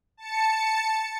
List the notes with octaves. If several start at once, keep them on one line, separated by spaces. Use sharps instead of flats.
A5 C#7